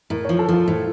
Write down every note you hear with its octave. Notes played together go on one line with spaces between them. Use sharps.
A2 A#4
F3 C#5
A4
F3 F4
A2